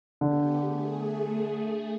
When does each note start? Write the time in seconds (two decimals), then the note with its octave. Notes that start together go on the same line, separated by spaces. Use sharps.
0.21 D3 B3 G4
0.59 A3 G#4